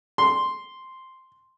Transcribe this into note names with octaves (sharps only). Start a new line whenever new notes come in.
C6